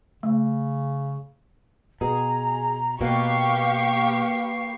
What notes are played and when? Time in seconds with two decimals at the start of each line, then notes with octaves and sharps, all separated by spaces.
0.23 C#3 A3
2.01 B2 G#4 A#5
3.01 B2 A#3 G4 B4 F5 C#6 C7